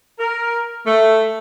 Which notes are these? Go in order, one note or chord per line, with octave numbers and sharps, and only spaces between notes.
A#4
A3